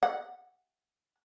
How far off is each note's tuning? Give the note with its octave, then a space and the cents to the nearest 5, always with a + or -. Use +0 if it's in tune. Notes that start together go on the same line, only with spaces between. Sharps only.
F#5 -20